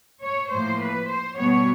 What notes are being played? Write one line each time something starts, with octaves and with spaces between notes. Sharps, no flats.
C#5
A2 F3 A#3 C5
B4
C5
B2 G3 B3 C#5